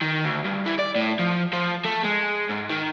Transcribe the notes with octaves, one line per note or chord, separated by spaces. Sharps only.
D#3
D2
G2
E3
D5
A2
F3
F3
A3
G#3
G#2
D#3